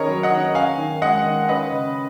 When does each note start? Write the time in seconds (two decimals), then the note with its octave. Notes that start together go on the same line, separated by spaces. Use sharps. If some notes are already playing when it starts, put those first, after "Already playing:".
Already playing: D#3 C#4 G#4 A#4 B4 C#5 D#5
0.08 F#3
0.23 D#5 F#5
0.32 D#3
0.55 C#4 F5 G#5
0.78 D#3
1.02 G#3 D#5 F#5
1.25 D#3
1.48 C#4 B4 D#5
1.72 C#3